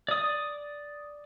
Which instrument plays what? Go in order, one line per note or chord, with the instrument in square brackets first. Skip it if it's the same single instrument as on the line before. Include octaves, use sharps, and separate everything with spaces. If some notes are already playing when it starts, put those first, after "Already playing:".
[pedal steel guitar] D5 D#6